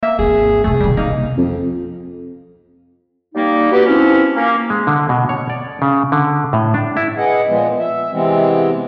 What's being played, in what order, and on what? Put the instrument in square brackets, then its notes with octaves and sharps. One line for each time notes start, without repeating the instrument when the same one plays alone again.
[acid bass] A#3 [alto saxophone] E5
[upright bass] G#1 E2 [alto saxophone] G#4
[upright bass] F2 C3 [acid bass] A3 [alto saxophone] G#4
[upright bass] B2 D#3 [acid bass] G3
[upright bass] C2 [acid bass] A#3 [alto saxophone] D#4
[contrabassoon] F2
[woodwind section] G3 A#3 D#4
B3 F#4 G4 B4
F3 C4 C#4 E4
A#3 C#4
[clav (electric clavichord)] G#3
D3
B2
C#5
D5
C#3
D3
A2
D4
E4
[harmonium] G#4 B4 D#5 F#5
A#2 F3 G#3 B3
E5
C3 E3 G#3 B3 C4